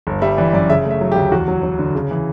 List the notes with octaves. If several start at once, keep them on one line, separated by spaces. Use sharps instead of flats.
G1
G3 E5
E3 D5
F#2 D5
C#3 E5
A3
E5
F#3
G4
D2
E2 F#4
F#3
F#3
D3
C#3
E3